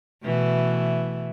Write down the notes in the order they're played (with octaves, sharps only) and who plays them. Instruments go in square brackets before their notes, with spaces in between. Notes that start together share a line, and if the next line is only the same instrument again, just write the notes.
[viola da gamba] B2 E3 A3